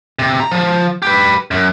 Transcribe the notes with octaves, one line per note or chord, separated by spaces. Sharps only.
C3
A#5
F3
G4 B4
F#2